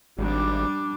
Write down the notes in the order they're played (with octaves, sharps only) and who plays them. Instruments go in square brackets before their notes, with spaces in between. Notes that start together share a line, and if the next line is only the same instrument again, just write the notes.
[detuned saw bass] G#1 [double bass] G3 D4